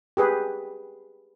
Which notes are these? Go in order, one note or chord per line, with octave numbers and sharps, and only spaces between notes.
G4 G#4 B4